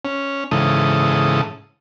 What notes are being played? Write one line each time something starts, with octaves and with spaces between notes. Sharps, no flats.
C#4
G#2 C#3 E3 A4 D#6